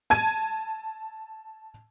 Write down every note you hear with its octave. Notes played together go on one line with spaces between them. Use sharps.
A5 G#6 D#7